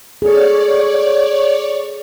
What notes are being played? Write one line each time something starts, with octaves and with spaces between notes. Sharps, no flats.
G#4 A4 C#5 D5